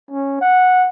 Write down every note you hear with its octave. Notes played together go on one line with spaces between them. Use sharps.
C#4
F#5